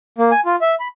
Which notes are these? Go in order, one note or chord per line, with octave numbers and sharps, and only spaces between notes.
A#3
G#5
F4
E5
B5